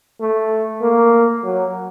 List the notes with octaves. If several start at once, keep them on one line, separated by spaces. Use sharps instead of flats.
A3
A#3
F#3